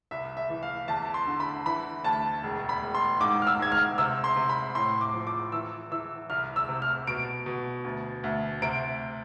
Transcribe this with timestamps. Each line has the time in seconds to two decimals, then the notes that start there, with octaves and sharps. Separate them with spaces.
0.11 C2 E5
0.37 E5
0.49 E3
0.63 F5
0.88 E2 A5
1.14 C6
1.27 D3
1.40 B5
1.66 E3 B5
2.04 D2 A5
2.43 E1
2.69 B5
2.82 E1
2.95 C6
3.21 G#2 D6
3.42 F6
3.47 E6
3.59 G#2 G#6
3.72 F6
3.98 C3 E6
4.24 C6
4.36 C3
4.49 B5
4.75 A2 C6
5.01 D6
5.14 F3
5.27 D6
5.52 E3 E6
5.91 E3 E6
6.30 C2 F6
6.56 E6
6.69 C3
6.82 F6
7.07 B2 D7
7.46 B2
7.84 D2
8.24 D2
8.62 C3 D7